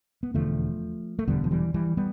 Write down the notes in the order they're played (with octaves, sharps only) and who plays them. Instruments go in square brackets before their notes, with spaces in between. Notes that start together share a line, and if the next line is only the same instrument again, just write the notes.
[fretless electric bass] B3
E1 E2 D3 F3 A3
A3
E1 E2 D3 G3 B3
F3
E3 G3
E3 G3
G3 B3